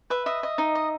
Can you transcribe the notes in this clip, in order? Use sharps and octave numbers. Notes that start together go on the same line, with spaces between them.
B4 E5
D#5 E5
D#5
D#4
D#5